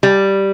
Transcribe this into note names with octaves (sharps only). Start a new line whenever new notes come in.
G3